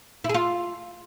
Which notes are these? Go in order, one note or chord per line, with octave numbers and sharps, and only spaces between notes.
E4
G#4
F4